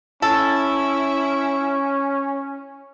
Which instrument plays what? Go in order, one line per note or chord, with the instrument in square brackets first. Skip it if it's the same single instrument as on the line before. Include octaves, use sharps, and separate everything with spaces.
[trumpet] C#4 [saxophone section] E4 [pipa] A4